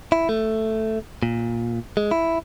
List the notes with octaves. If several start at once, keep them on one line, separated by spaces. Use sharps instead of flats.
E4
A3
A#2
G#3
E4